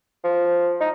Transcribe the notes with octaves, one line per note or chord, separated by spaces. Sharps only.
F3
D#4